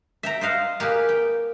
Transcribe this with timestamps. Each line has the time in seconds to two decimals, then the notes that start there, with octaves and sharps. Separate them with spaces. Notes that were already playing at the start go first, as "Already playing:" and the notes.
0.23 E5 G5 A#5
0.41 C5 D#5 F5 F#5
0.80 A#3 G4 G#4 B4
1.09 G5